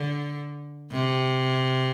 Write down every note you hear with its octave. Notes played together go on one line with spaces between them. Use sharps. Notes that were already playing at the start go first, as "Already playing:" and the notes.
Already playing: D3
C3